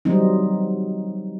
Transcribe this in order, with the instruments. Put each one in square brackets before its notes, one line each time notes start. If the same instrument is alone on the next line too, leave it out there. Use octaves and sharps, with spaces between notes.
[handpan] F#3 G3 C4 D#4